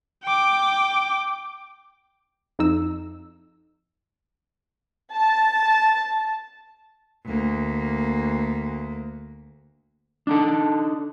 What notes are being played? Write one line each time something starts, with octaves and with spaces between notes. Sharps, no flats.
G5 D6
F2 D#4 E6
A5
D2 A#3
D4 D#4 A4